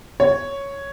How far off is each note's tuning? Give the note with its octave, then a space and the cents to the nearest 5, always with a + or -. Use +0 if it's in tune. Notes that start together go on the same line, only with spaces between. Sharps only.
C#5 +0